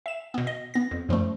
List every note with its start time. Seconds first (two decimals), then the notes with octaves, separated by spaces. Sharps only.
0.06 E5 E7
0.34 B2 B3
0.47 D#5
0.74 B3 A#6
0.91 F2
1.09 F#2 F3 G3 A3